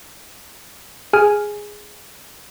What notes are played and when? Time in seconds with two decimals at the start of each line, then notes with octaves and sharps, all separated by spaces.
1.13 G#4 G#5 F6